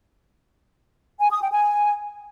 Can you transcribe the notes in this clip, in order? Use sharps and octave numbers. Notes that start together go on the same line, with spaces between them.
G#5
D#6
G5
G#5